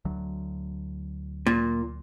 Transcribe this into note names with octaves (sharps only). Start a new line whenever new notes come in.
D2 F#3
A#2